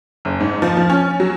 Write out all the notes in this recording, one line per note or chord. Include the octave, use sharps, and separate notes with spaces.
F#1
G#2
F3
F3
C#4
F#3